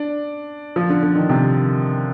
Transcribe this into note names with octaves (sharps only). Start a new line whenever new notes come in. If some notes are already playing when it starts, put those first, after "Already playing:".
Already playing: D4
F3
D3
D3
D#3
C3